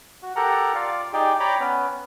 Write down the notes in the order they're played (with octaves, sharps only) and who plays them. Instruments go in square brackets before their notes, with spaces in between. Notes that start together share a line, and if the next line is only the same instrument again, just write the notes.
[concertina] F#4
G4 A4 A#4 F#5 A#5
F4 D5 F5
D#4 G4 G#4 D5 G5
C#5 D5 G5 A#5 B5 D6
B3 C#4